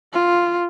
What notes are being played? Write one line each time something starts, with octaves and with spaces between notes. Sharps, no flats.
F4